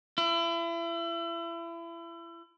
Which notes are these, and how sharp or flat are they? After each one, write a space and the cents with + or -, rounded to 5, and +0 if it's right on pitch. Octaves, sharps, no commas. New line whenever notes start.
E4 +35